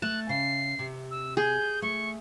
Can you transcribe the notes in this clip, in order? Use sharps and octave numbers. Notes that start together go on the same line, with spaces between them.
A3 A5 F#6
C#3 C7
C3
E6
G#4 G6
A3 C#6